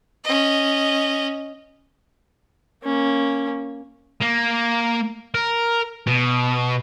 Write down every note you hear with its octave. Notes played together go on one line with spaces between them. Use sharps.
C#4 D#5
A#3 C#4
A#3
A#4
B2